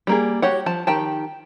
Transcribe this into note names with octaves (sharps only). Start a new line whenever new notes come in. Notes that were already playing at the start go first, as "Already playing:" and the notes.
G3 A#3 G#4
F#4 G4 C#5 F#5
F3 A5
D#3 G4 G5 A5